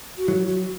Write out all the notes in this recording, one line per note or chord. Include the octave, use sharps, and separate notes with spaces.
F#4
F#3 E4
F#4